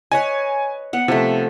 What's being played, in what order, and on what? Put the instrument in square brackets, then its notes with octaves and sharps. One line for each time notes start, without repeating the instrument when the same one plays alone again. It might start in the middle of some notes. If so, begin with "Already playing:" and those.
[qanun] B4 C#5 D#5 [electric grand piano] G#5
[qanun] B3 F#5
[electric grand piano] C3 [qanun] F3 A3